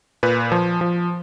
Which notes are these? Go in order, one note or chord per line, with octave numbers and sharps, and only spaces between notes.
A#2 B4
F3
F3